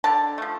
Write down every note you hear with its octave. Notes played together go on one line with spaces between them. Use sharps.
D3 A5
F3 A3